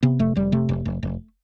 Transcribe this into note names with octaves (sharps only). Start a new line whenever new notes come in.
C3 B3
F1 A3
F1 G3
C3 A3
F1
F1
F1